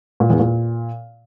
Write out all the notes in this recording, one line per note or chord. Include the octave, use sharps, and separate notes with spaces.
A#2
E2
A#2